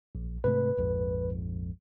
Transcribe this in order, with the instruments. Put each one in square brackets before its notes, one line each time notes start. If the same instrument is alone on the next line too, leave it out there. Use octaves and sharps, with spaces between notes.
[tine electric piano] A#1
[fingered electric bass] G#2 C3 A3 [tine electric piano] B4
[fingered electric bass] A#1 F2 G#2